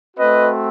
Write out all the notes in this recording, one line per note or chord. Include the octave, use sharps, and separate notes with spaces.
A3 C4 F#4 B4 D#5